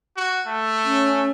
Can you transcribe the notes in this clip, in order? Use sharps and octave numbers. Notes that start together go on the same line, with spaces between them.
F#4
A3
C#4